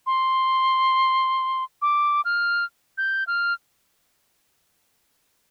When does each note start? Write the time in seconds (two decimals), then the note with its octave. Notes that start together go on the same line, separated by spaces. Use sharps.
0.07 C6
1.82 D6
2.25 F6
2.98 G6
3.27 F6